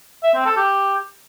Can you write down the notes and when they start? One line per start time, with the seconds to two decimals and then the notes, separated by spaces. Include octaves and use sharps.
0.23 E5
0.34 C4
0.46 A4
0.57 G4